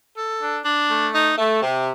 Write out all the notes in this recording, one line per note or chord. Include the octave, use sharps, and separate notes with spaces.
A4
D4
D4
A3
D#4
A3
C3